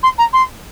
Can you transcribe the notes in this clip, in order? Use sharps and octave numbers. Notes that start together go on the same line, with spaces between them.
C6
A#5
C6